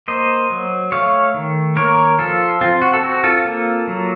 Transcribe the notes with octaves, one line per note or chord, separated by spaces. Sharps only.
A#3 C5 D#5
F#3
A3 C#5 F5
D#3
A#3 A#4 C#5
F3 F4 A4
C4 F4
F#4
A4
C4 F#4
F4 A4
A#3
F#3